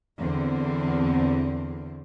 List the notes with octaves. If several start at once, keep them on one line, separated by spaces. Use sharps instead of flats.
E2 D3 C4